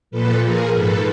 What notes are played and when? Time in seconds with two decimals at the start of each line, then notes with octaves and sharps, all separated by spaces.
0.11 A#2 F3 A4 B4
0.43 G#4 A#4
0.74 G#2 F3 A4 B4